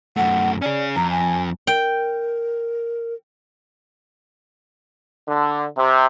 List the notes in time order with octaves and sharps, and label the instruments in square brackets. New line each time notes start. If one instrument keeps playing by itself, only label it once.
[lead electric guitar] F#2 A3 [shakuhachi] F#5
[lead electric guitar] C#4 G#4 [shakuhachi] D5
[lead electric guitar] F2 [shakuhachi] A#5
[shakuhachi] G#5
[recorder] A#4 [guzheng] G5
[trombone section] D3
C3